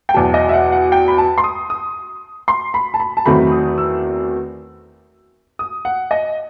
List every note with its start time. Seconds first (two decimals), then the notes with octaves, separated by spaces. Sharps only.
0.09 G5
0.14 E2 B2 F#3 A5
0.34 D#5
0.49 E5
0.53 F#5
0.72 F#5
0.92 G5
1.08 B5
1.18 A5
1.38 C6
1.44 D#6
1.70 D#6
2.48 C6
2.74 B5
2.94 A5
3.00 B5
3.17 A5
3.26 E2 D#3 F#3 A3 C4 B5
3.52 D#6
3.78 E6
5.59 D#6
5.85 F#5
6.11 D#5